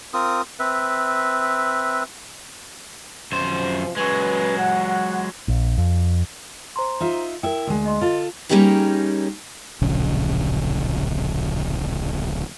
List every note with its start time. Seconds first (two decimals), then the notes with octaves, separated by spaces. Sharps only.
0.14 C4 F4 A#4 D#6
0.59 C4 B4 E5
3.32 F#2 C3 F3 C5
3.97 F#3 G#3 C#4 B4
4.58 F#5
5.48 A#1
5.78 F2
6.76 C5 A#5 C6
7.00 D#4 F4 E5
7.43 E4 A#4 E5 G5
7.67 D2 G#3
7.86 D#5 C6
8.01 F4 A4
8.49 G3 A#3 C#4 D#4 G4 G#4
9.82 D1 A#1 C#3